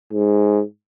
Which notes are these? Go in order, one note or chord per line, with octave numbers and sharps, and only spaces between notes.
G#2